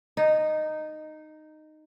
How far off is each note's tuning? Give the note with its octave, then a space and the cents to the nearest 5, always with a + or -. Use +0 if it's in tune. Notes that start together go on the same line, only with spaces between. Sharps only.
D#4 -10